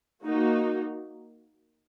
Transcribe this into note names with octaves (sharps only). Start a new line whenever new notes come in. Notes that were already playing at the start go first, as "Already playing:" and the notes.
A#3 D#4 F#4